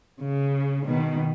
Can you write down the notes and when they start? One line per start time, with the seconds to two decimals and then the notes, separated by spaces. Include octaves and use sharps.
0.20 C#3
0.87 B2 D#3